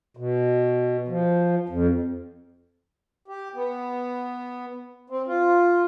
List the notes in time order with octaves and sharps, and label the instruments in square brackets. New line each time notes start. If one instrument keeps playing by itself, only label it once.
[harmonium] B2
F3
F2
G4
B3
C4
F4